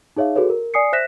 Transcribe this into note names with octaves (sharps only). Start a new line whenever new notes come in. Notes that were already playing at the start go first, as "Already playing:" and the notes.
D#4 G#4 C#5 E5 F5
F#4 G#4 A4 B4 C#5
A#4
D5 G#5 D#6 C7 C#7
C5 E5 F#6 A#6 B6 E7